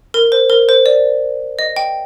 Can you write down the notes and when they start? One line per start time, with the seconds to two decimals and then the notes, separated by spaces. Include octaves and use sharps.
0.14 A#4
0.32 C5
0.50 A#4
0.69 C5
0.86 D5
1.59 D#5
1.76 G5